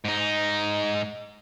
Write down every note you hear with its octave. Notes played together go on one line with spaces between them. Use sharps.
G#2 D#4